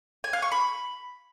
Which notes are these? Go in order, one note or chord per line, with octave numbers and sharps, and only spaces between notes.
G#5
F5
C#6
B5